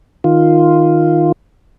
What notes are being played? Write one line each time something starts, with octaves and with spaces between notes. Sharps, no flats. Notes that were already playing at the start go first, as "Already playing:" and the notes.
D#3 F4